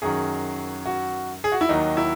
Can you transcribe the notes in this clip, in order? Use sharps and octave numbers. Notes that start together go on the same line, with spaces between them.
F#2 D#3 F#3 G#4
F#4
G#4
F#4
E4
D#2 D#3 F#3 D#4
E4